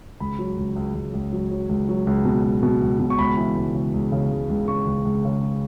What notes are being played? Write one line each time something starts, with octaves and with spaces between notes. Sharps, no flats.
C#2 B5
F#3
C#2
C#2
C#2
C#2
F#3
F#3
C#2
F#3
C#2
B2
C#2
B2
C#2
B2
C#6
C#2 B5
E3
C#2
C#3
C#2
C#3
C#2
C#2
C#3 C#6
C#2
C#2
C#3